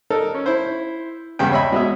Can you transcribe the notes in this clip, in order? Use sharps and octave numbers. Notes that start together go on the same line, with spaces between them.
D#4 A4 A#4
C#4
E4 C5
E2 G2 C#3 B3 G5
C#5 D#5 E5 B5
B2 G#3 E5